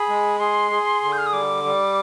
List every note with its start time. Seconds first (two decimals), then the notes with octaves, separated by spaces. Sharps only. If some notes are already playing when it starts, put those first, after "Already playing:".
Already playing: G#4 B5
0.09 G#3
0.39 G#4 C6
0.71 G#4
1.02 D3
1.12 G6
1.18 F6
1.26 D#6
1.32 G3 D6
1.64 G3